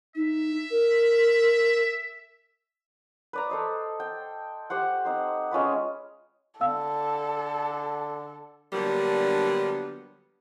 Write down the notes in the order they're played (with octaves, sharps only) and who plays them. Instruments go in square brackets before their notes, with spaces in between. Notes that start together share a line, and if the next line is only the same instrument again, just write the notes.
[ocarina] D#4 [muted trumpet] E5
[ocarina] A#4
[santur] B4 D5 A#5
A4 C5 D#5
G5
G4 C5 F#5
C4 D#4 C5
G#3 C#4 F4 B4
[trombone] D3 [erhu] A4 [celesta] F5 E6
[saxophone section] D3 F#3 G3 A#3 B3 D4